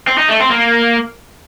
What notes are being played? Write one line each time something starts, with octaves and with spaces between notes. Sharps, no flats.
C4
D#4
A3
C4
A#3